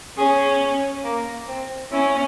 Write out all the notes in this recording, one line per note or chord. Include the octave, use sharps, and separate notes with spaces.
C#4 G#4
A#3
C4
C#4 E4